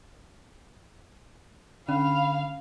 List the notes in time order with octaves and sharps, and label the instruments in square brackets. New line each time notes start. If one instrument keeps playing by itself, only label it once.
[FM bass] D3 [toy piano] C#4 [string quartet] F5 [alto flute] B5